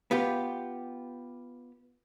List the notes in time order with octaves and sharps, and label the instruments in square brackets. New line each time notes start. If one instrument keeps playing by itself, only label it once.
[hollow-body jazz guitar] B3 F4 G4